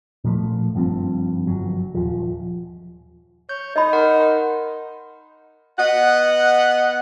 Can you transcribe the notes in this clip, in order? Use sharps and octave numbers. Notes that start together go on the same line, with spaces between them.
A#2 F3 A3
F#1 G2 F3 C4
G1 C2 F#3
D#1 F3
C#5 G6
D#4 D#5 B5
A#4 F#5 C6
B3 D#5 F#5